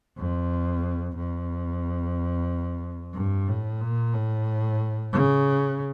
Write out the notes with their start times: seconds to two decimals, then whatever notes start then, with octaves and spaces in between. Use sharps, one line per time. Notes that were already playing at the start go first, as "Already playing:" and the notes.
0.18 F2
1.16 F2
3.14 G2
3.48 A2
3.81 A#2
4.14 A2
5.12 C#3